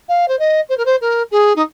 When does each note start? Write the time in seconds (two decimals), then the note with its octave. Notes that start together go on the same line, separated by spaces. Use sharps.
0.09 F5
0.28 C5
0.39 D#5
0.69 C5
0.78 A#4
0.85 C5
1.01 A#4
1.31 G#4
1.56 D#4